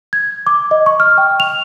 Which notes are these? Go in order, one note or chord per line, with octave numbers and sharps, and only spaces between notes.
G#6
D6
D#5
C#6
F6
G5
F7